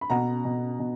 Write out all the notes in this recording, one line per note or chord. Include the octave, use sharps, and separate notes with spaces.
B5
B2 F#5 A#5
B2
B2